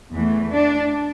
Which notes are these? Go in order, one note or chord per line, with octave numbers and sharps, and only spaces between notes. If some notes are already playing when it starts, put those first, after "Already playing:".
E2 E3 A3
D4